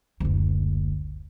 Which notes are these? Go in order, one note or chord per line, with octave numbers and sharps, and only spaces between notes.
F#1 D2